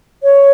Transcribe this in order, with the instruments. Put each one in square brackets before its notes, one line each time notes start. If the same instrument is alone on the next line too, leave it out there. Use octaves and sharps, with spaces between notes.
[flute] C#5